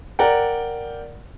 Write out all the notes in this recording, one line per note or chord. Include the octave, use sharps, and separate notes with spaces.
A#4 D5 F#5 G5